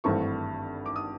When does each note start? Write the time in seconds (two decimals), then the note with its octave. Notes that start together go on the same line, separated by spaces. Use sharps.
0.04 G#1 G2 E3 A3 C4 C#6
0.86 D6
0.96 D#6